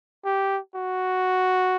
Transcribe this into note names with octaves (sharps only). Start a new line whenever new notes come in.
G4
F#4